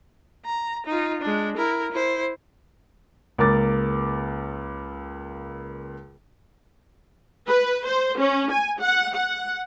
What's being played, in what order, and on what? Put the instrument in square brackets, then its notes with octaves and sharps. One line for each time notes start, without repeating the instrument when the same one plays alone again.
[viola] A#5
D#4 F4
G#3 D4
E4 A#4
E4 C5
[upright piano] C#2 A#3 A#4 D6 A6
[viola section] B4
C5
C#4
G#5
F#5
F#5